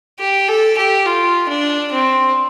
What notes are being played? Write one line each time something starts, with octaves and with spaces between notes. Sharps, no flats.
G4
A4
G4
F4
D4
C4